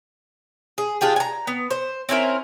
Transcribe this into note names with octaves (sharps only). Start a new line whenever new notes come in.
G#4
D4 F4 G4 G#4
G#5 A#5
B3
C5
C4 C#4 E4 A#4